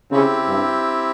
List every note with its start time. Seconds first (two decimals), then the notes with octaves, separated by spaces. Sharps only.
0.11 C#3 C4 E4 G4
0.49 G2